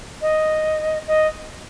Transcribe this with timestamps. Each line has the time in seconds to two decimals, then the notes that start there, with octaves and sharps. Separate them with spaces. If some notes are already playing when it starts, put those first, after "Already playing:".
0.21 D#5
1.07 D#5